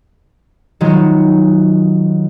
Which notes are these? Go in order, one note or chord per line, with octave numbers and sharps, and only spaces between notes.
D#3 F#3 G#3 B3 F4